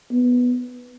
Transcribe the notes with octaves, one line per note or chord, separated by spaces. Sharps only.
B3